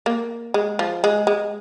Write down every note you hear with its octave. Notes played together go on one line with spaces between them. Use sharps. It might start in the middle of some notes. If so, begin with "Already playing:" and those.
A#3
G#3
F3
G#3
G#3